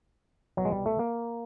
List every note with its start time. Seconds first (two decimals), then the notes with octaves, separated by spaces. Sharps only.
0.57 C2 B2 F#3
0.65 G#3
0.72 G3
0.86 A3
0.99 A#3